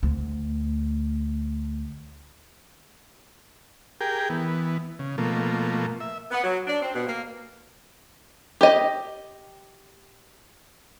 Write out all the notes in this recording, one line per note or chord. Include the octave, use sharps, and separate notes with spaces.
D2 A3
G4 G#4 A#4 G5
E3 B3
C#3
B2 F3 A3 A#3
E5
B3
F#3
D4
C4
B2
A#3
G4 D#5